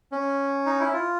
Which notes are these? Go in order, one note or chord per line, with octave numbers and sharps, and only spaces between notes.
C#4
D#4
E4
F4